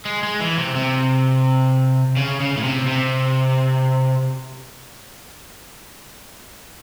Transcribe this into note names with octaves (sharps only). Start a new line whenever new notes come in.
G#3
G#3
E3
C3
C3
C#3
C#3
A2
C3
C3